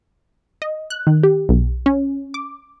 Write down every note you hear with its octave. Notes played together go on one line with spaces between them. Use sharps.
D#5
F#6
D#3
G4
B1
C#4
D6